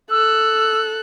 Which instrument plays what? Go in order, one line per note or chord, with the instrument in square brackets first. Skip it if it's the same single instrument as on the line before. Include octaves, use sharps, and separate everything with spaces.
[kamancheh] A4 F#6 [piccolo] E6